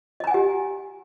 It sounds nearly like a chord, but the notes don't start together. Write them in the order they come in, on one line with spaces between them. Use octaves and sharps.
D#5 A#5 G#5 F#5 G4